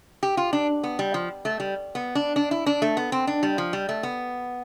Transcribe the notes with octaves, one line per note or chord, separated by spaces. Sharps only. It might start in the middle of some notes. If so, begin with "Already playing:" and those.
G4
F4
D4
B3
G3
F3
A3
G3
B3
D4
D4
E4
D4
A3
B3
C4
D4
G3
F3
G3
A3
B3